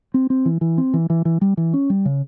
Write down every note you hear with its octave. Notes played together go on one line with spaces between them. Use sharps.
C4
C4
E3
E3
C4
E3
E3
E3
G3
E3
C#4
G3
C#3